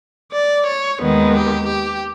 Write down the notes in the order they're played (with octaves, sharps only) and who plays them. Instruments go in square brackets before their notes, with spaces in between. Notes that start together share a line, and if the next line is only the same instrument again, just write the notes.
[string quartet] D5
C#5
D#2 D#3 G#3 B3
G4
G4